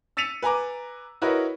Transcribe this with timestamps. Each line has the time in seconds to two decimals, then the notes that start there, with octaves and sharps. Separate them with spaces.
0.17 E6 A6 B6 C#7 D#7 F7
0.42 B4 G#5 A#5 D6
1.22 E4 F#4 A#4 B4 C#5 D#5